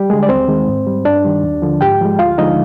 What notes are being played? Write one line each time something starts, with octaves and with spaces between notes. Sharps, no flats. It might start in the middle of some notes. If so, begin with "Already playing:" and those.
Already playing: G3 G4
D3 G#3 G#4
D5
D#2 C4 C5
D#3 G#3
G#2
G3
G2 D4 D5
D#3 G3
D#2
D3 F3
G#2 G4 G5
F3 G#3
D2 F4 F5
D3 F3 G#3 D#4 D#5